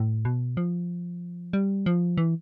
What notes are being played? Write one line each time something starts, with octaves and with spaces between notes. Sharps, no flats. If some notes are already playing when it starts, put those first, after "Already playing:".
Already playing: A2
B2
F3
G3
F3
E3